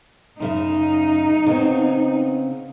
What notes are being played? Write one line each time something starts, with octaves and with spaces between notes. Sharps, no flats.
F#2 C#3 D#4 E5
C#3 B3 C4